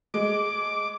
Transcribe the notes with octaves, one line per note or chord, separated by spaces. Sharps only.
G#3 D6